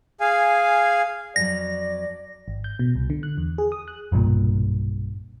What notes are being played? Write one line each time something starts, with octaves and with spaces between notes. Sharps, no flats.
G#4 F5 G#5
F2 F#3 D5 A#6
G#1
G6
B2
C2
D3
F#6
E2
G#4
D#6
F#6
F#1 B1 G2 A#2